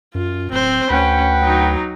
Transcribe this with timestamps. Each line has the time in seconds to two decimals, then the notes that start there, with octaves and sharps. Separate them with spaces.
0.15 F#2 F4
0.52 D1 C4 C5
0.90 D2 C#4 B4 F#5 G5
1.40 F#3 D#4